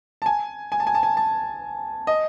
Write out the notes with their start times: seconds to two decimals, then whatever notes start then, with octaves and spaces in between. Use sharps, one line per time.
0.22 A5
0.26 G#5
0.72 G#5
0.80 A5
0.87 G#5
0.95 A5
1.03 G#5
1.17 A5
2.07 D#5